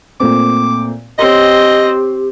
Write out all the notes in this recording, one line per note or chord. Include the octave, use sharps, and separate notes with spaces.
A#2 A3 C4 D6
C4 G4 C#5 D#5 C6